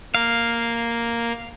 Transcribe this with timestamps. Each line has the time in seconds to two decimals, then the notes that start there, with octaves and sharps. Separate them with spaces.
0.15 A#3 F5